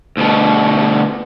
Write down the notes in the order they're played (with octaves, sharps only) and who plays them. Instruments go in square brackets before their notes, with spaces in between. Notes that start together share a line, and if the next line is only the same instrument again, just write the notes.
[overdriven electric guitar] D2 B2